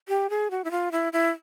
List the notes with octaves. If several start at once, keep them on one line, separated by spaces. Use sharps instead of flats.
G4
G#4
F#4
E4
F4
E4
E4